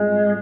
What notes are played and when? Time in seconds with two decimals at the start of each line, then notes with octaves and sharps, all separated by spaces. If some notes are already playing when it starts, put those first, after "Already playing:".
Already playing: G#2 G3 G#3 C4 F4